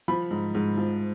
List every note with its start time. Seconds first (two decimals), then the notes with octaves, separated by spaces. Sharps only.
0.08 F3 B5
0.31 G#2
0.55 G#2
0.77 F3